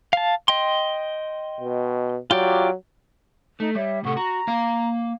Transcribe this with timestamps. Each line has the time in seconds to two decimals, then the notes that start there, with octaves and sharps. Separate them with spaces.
0.13 F5 A5
0.48 D#5 G5 C6
1.61 B2
2.31 F#3 F4 G4 D5
3.60 A3 D#4
3.75 G3 C#5 E5
4.04 A2 C3 A4 F#5 C#6
4.17 F#4 A#5
4.47 A#3 F5